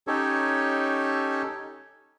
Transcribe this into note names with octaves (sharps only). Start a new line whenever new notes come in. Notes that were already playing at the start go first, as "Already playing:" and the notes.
C#4 D#4 G4 A4 C#5